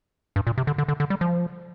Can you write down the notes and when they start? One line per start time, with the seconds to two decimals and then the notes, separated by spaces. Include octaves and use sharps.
0.36 G2
0.47 A#2
0.58 C3
0.67 D3
0.78 D3
0.88 D3
1.00 D3
1.10 G3
1.21 F3